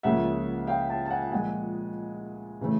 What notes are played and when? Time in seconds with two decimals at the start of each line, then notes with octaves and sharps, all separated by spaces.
0.03 C#2 C#3 F3 A#3 E5 F#5
0.67 F5 G5
0.89 G5 A5
1.05 A5
1.10 F#5 G#5
1.32 A#2 F3 G#3 F#5 G#5
2.61 C#3 E3 A3